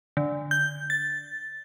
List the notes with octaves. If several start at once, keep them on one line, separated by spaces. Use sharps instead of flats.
D3
G6
A6